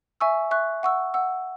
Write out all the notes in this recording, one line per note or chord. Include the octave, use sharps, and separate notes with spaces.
E5 G#5 C#6 E6
E5 C#6 F#6
F#5 C#6 E6
F#5 E6